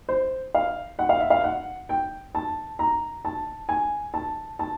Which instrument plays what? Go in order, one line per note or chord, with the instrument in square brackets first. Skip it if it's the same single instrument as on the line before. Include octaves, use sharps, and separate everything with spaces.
[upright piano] C5
F5
F#5
F5
E5
F5
F#5
G5
A5
A#5
A5
G#5
A5
A5